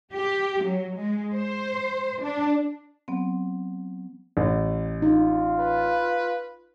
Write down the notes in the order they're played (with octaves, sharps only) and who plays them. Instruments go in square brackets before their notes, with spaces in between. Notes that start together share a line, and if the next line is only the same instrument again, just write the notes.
[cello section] G4
F#3
G#3
C5
D4
[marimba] F#3 B3 C4
[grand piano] A1
[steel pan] D#4 [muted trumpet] F4
[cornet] B4